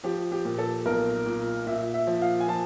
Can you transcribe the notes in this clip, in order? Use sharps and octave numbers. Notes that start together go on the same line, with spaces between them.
F3 G4
G4
A#2
A4
B1 A#4
A#2
A#2 E5
E5
F3
F5
G#5
F3 A5